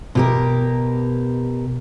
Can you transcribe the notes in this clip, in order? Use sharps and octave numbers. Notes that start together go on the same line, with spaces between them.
B2 G4 A#4